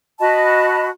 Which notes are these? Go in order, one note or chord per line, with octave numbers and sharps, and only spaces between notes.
F#4 D#5 A5 B5